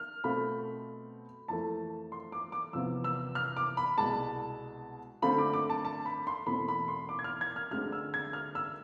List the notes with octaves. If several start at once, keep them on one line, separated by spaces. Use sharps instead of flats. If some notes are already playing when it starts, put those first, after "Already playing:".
Already playing: F6
B2 A3 C4 F4 B5
F2 E3 A3 A5
C6
D6
D6
E2 C3 F3 B3 F4 E6
E6
F6
D6
B5
C2 B2 G#3 A5
D3 A3 C4 F4 B5
D6
D6
A5
A5
B5
C6
E2 B2 A3 C4 B5
B5
C6
D6
G#6
F6
G#6
F6
D2 D3 G#3 C4 F4 F6
E6
G#6
F6
E6